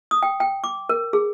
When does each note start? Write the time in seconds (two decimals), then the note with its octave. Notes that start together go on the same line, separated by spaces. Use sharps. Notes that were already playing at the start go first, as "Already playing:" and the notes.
0.11 D#6
0.23 G5
0.40 G5
0.64 D6
0.89 A#4
1.13 G#4